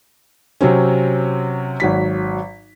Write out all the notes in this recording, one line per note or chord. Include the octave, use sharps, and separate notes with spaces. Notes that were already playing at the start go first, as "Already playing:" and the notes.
C3 F#3 C4 C#4
G#1 F#3 B6